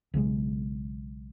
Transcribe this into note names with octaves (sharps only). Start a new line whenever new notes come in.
B1 C#3 E3 G#3